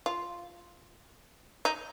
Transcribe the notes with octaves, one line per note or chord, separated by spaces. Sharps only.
F4
D#4